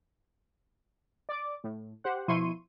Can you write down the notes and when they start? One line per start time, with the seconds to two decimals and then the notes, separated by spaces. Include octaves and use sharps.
1.29 D5 D6
1.64 A2
2.04 G4 C5 F#5
2.28 B2 F3 E4 C6 C#6 D#7